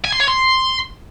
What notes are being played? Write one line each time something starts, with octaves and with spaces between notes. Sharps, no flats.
G#5
C6
C#5
C6